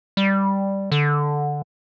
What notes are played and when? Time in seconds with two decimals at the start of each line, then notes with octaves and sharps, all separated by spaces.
0.17 G3
0.92 D3